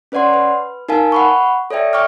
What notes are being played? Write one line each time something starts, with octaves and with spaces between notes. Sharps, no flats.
C#4 B4 C#5 D5 F#5 C6
B4
D#4 A#4 F5 G#5 A5
F#5 B5 C#6
A4 C#5 D5 E5 G5
E5 G5 C#6 D6 F6